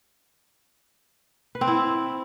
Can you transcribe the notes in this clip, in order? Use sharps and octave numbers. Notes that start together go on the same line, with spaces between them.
B4
C4
E4